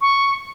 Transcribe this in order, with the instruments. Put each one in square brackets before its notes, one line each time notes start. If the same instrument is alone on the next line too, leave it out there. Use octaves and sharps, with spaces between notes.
[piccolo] C#6